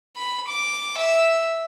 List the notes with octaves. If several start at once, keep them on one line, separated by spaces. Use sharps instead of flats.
B5
D6
E5